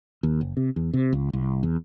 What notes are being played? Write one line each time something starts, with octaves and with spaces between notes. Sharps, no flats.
D#2
F#1
C3
E2
C3
C#2
C2
E2